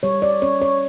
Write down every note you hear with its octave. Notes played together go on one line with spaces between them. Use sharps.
G3 C#5
C#4 D5
C#4 C#5
C#4 C#5